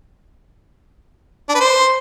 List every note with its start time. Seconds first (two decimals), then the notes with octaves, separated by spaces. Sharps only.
1.49 D4
1.55 B4
1.60 C5